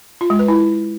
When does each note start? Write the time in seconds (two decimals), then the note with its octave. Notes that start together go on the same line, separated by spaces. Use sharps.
0.21 F4
0.30 G#3
0.39 B4
0.48 E4